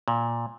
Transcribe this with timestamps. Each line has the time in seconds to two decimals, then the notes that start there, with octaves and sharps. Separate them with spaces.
0.08 A#2